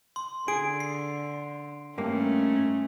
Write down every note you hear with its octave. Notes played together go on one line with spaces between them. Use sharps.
C6
D3 G#4 D7
C7
G2 D#3 A3 A#3 C#4